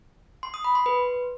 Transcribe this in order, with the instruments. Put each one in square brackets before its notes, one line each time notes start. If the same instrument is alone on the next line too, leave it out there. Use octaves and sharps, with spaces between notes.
[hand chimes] C6
D#6
B5
C6
B4